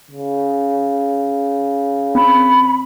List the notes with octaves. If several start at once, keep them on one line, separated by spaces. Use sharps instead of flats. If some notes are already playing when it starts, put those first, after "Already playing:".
C#3
C4 B5